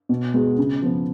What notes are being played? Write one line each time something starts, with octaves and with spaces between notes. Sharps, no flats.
B2
G#3 B3 F#4
C#3
F3 B3